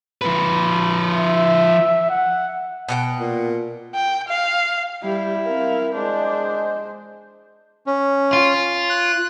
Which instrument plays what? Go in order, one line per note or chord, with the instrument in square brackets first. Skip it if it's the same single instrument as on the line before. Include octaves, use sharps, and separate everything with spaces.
[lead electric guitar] F3 B4
[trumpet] E5
F#5
[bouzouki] B2 F#5 G5
[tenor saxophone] A#2
[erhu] G5
F5
[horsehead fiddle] G3 G4 [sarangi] E4
[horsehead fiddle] C4 F5 [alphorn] A#4
[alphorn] G#3 [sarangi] D4 [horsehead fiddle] C5
[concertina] C#4
[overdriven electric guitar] F4
[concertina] F#6